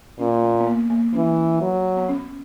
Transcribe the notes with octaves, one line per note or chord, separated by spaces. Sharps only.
A#2 C#4
A#3
B3
A#3
A#3
E3 C#4
F#3
B3
C#4